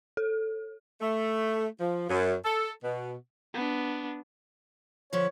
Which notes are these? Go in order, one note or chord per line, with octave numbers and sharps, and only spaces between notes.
A4
A3
F3
F#2
A4
B2
B3 D4
D3 F3 B4 C#5